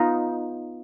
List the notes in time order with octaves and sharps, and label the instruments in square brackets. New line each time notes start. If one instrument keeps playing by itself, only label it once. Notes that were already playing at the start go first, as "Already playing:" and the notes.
Already playing: [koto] B3 D#4 F4